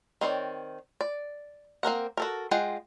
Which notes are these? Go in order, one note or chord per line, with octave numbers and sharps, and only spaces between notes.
D#3 C4 C#5 D5
D5
A#3 C4 A#4 F#5
F#4 A4 A#4
G#3 F4 F#5 G5